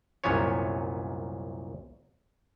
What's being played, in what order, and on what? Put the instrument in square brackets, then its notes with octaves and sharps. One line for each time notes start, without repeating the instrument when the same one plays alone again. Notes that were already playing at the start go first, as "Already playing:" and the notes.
[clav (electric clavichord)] C2 F#2 A#2 B3 C#4 C#5